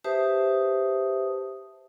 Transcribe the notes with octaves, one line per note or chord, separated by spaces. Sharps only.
G4 B4 C5 E5 A5 D#6